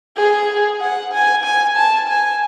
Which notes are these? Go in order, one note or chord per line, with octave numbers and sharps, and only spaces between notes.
G#4
F#5
G#5
G#5
A5
G#5